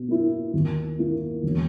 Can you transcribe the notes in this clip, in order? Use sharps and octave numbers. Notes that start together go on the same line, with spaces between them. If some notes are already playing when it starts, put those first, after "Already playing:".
Already playing: B2
A#3 E4
D#2
D#3 A#3 E4
E1